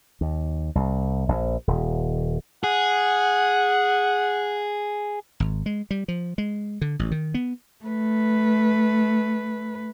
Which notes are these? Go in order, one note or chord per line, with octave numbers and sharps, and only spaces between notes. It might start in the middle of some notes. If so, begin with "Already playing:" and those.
D#2
C2
A#1
D#1
G#4 F#5
G#1
G#3
G3
F3
G#3
D3
A1
D#3
B3
A3 B4